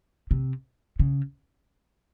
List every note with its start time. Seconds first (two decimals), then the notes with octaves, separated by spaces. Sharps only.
0.31 C3
0.99 C#3